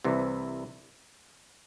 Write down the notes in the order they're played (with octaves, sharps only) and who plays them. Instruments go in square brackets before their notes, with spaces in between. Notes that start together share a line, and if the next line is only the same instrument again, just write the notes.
[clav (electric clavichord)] C2 C3 E3